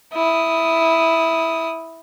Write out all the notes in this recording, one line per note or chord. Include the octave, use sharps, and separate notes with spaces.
E4 D#6